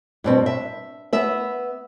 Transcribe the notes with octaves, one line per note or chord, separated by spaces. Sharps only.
G2 B2 C4
E5
B3 E5